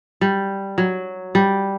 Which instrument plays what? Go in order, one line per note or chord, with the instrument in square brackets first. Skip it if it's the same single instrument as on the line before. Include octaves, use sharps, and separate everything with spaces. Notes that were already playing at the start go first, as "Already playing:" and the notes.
[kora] G3
F#3
G3